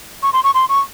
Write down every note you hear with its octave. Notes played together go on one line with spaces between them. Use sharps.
C#6
C6
C#6
C6
C#6